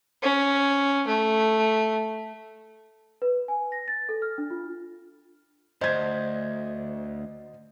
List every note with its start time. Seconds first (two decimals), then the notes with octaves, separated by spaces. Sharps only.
0.23 C#4
1.08 A3
3.22 B4
3.48 G#5
3.72 A#6
3.88 A6
4.09 A4
4.22 F6
4.38 D4
4.50 F4
5.81 D2 C5 D#5 G#6